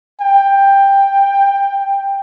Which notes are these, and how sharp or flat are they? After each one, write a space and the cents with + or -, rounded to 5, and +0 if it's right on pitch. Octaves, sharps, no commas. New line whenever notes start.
G5 +10